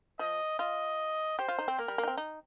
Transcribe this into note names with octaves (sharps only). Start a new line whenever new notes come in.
F3 D#5
F4 D#5
G4 C5
F4
D#4
C4
A#3 A#4
G3
A#3
D#4
C4
D#4